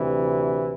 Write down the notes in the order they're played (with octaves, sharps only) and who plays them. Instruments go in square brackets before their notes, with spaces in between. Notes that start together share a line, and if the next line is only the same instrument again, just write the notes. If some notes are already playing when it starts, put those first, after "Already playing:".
Already playing: [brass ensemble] D2 C3 E3